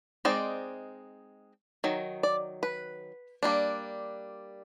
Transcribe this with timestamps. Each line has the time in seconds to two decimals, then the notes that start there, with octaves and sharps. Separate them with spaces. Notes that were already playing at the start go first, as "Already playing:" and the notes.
0.25 G#3 C4 D#4 D5
1.84 D#3 F#3
2.23 D5
2.63 B4
3.43 G3 A#3 D4